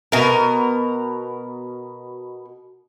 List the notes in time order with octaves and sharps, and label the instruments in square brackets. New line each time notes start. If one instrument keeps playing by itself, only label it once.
[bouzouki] B2 A#4